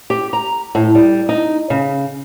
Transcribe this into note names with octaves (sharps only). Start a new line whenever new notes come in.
G4
A#5
A2
G3
D#4
C#3